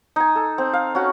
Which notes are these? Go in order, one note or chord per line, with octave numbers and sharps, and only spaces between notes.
D#4 G#5
A4
C4
F5
C#4 F#4